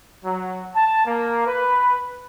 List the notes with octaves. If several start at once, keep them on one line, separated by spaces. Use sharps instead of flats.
F#3
A5
A#3
B4